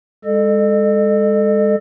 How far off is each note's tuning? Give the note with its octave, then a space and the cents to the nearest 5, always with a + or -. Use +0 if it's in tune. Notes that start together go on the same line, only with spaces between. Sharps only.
G#3 -20 A4 +0 D#5 -40